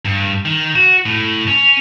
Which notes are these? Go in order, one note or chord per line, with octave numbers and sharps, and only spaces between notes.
G2
D#3
F#4
A2
C#4